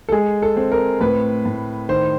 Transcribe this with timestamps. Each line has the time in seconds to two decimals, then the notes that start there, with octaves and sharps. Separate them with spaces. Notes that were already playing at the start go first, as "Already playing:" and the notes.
0.09 A4
0.12 G#3 G#4
0.42 A4
0.57 C4
0.72 A#4
1.01 A2 B4
1.45 A2
1.89 D#3 C5